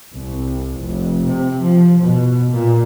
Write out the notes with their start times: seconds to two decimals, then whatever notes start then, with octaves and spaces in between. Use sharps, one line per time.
0.14 C2
0.79 F1
1.26 C3
1.63 F3
2.02 B2
2.53 A#2